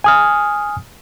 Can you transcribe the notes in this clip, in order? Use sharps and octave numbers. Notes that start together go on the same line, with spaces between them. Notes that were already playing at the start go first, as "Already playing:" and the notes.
G#5 D#6 F6